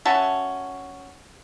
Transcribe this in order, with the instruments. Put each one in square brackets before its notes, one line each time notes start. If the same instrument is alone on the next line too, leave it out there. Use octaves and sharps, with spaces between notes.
[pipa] C#4 F#4 E5 A5